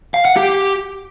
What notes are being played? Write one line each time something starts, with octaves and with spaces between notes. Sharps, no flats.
F5
F#5
G4